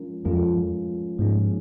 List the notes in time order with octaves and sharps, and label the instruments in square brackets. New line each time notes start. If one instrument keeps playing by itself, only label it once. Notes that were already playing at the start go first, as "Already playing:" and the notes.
Already playing: [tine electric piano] F3 G#3 C#4 F4 A#4
[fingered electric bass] F2 [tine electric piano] F3 G#3 C#4 F4 A#4
[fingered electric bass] G#2 [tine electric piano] F3 A#3 C#4